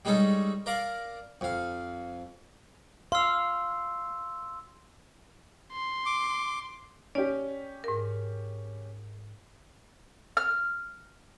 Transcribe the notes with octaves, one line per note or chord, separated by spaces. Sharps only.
G3 G#3 C#4 D#4 A4
A#4 D5 F5 A#5
F2 F5
F5 C6 E6
C6
D6
C#4 G4 D5
G#2 A#4
F6